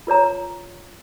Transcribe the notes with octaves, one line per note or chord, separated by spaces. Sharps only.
F4 B4 C#5 A#5